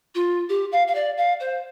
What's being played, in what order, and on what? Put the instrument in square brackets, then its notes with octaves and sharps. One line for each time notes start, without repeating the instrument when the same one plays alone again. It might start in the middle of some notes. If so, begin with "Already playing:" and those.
[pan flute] F4
G4
F5
F5
D5
F5
C5